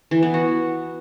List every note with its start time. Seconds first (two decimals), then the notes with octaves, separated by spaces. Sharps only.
0.11 E3
0.23 B3
0.34 F#4